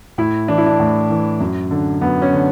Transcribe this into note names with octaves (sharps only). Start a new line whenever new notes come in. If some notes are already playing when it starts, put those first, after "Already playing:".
A2 E4
E3 D4
E4
D4
A2
E3
F#2
D3
F#2 B3
C#4
D3